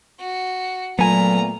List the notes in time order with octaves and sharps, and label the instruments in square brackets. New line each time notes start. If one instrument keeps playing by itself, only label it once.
[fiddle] F#4
[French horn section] A#2 A3 [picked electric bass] F#3 [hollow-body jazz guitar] B3 G#5 [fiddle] A#5